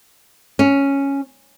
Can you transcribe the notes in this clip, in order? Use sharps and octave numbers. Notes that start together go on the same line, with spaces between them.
C#4